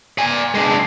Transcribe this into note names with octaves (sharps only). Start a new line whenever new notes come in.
D5 G#5
G#3 D4